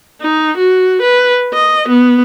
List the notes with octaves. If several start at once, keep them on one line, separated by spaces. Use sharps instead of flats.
D#4
F#4
B4
D#5
B3